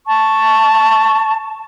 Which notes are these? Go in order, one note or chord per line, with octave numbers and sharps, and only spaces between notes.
A5 C#6